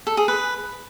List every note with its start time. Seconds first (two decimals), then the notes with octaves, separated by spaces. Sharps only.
0.07 A4
0.17 G#4
0.28 B4